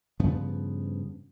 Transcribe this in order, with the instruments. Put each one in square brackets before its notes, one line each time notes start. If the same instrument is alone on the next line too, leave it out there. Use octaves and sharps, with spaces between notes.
[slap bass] G2 C#3 F3 B3